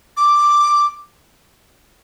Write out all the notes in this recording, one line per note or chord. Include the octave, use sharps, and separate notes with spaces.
D6